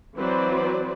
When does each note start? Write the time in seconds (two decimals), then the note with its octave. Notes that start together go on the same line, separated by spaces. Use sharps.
0.16 E3 F#3 C4 B4 C5 D5